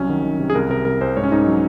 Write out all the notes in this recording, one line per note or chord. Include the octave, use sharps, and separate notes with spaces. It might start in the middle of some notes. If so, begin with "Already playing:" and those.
Already playing: C2 F#3 C#4
D#3
D#3
C3
G#4
C2 A#4
C3 A#4
C2 A#4
C2 C5
G#2 C#5
C#4
G#2 D#4
F#3